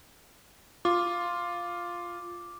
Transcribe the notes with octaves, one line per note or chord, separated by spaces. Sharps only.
F4 D6